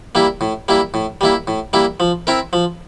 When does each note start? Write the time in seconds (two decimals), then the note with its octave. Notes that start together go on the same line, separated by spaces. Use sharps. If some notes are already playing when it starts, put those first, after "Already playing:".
0.15 G3 A#3 E4
0.41 A2
0.68 G3 A#3 E4
0.94 A2
1.21 G3 A#3 E4
1.47 A2
1.73 G3 A#3 E4
2.00 F3
2.27 C4 E4 A#4
2.53 F3